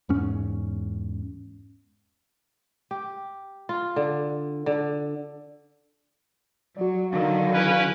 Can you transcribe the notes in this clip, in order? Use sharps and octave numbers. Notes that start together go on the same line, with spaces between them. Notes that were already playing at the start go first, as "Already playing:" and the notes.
E2 G#2 C#4
G4
F4
D3
D3
F#3 F#4 D5
D3 D#3 F#3 F5
C#4 E4 B4